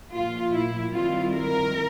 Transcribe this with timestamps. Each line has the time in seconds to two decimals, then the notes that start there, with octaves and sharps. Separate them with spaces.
0.13 A#2 F3 A#3 F4
0.53 E4
0.92 D#3 G3 C4 E4 F4
1.32 A#4